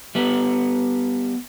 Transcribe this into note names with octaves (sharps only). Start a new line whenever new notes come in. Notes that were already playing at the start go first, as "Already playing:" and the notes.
G3 B3